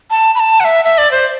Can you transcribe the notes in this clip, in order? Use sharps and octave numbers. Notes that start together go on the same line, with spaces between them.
A5
B5
A5
F#5
E5
E5
D5
C5